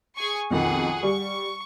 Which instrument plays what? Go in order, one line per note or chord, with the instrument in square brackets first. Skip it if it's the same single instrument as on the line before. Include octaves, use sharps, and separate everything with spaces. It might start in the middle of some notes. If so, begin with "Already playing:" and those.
[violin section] G#4 G#5 C#6
[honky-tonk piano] B1 F2 D#3 [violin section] G#4 F#5
[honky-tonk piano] G3 [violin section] C#6